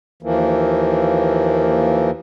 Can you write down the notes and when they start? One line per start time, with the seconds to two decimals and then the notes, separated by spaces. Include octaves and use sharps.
0.23 D#2 E3 F3 A#3